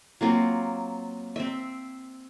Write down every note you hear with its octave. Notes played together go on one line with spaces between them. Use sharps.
F#3 A#3 C4 F4
C4 C5 E5